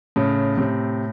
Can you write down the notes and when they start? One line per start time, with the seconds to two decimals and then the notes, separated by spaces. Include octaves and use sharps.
0.16 A2 C#3 C#4
0.57 A2 C3 C4